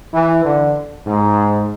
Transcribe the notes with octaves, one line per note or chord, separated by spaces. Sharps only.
E3
D3
G#2